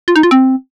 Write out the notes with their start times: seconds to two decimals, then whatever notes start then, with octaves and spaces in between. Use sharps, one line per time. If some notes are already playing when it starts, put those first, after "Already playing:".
0.08 F4
0.16 D#4
0.23 F4
0.31 C4